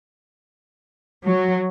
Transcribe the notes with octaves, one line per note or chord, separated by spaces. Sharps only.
F#3